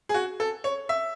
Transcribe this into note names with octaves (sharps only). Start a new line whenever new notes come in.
G#4
F#4
A4
C#5
E5